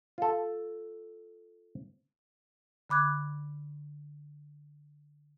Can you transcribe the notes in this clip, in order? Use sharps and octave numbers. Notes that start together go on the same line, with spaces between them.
F4 A4
D3 B5 D6 F#6 G#6